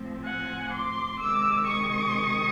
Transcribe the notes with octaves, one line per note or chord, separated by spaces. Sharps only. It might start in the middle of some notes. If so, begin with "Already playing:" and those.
Already playing: A2 F3 A3 C4
F#5 G#5
C6 D6
C3 D#3 G#3 D6 E6
C#6 D#6